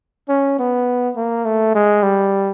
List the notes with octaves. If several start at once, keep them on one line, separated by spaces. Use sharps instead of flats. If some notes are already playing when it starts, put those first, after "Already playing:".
C#4
B3
A#3
A3
G#3
G3